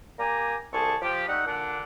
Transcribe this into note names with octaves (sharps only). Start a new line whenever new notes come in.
A#3 G4 G#5 A#5
C2 G#4 A4 A5 C#6
F3 G4
G3 A3 D#4 F#5
A#2 D3 D4 D5 F#5